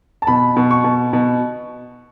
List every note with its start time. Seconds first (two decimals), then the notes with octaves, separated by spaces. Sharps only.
0.22 A5
0.27 B2 B5
0.56 B2
0.71 C#6
0.84 B2
1.13 B2